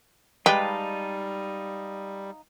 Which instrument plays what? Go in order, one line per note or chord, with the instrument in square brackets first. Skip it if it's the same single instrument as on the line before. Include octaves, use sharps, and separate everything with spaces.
[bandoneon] G3 [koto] G#3 B4 [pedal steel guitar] D#4 F5 A5 [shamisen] G4